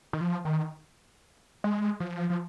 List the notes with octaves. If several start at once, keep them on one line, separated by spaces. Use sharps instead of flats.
D#3
F3
D#3
G#3
F3
F3